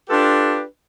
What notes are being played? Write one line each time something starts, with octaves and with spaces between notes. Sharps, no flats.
D4 F4 G4 A4 B4